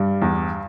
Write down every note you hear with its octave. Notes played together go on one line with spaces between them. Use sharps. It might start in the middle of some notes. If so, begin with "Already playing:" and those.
Already playing: G2 G3
E2